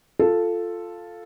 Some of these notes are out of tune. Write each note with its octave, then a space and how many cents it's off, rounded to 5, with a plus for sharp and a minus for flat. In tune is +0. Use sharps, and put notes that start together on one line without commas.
F4 +0 A4 +0